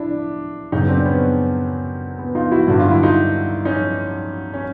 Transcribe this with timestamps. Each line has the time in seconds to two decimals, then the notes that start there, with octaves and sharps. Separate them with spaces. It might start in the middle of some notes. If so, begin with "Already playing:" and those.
Already playing: D4 E4
0.72 F#2 C#3 F#3 B3 C#4 D#4
0.89 C4 D4
1.05 B3 C#4
2.19 B3
2.35 D#4 F4
2.51 E4 F#4
2.68 G2 D3 F#3 F#4
2.80 F4
2.91 E4
3.03 D#4 F4
3.65 C#4 D#4
4.53 C#4